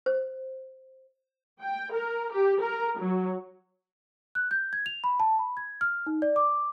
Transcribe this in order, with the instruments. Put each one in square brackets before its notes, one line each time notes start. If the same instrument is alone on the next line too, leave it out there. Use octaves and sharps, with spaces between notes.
[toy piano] C5
[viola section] G5
A#4
G4
A#4
F#3
[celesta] F#6
G6
G#6
F7
B5
A5
B5
G#6
F6
D#4
D5
D6